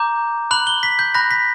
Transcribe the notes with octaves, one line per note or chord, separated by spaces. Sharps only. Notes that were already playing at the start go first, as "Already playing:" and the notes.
Already playing: A#5 D6 G6
B5 F#6 F#7
G7
B6
G6
B5 F#6 A#6
B6